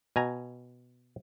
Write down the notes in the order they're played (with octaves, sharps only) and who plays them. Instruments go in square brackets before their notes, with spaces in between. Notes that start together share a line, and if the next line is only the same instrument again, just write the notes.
[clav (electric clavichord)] B2 G#5 A#5